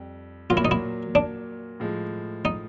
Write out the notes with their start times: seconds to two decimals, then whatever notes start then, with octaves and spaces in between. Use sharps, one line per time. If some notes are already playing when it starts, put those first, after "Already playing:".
Already playing: F2 G3
0.50 A#2 F#3 A#3 F4
0.57 E4
0.65 D#4
0.71 E4
1.15 D4
1.80 A2 F3 G#3
2.45 D#4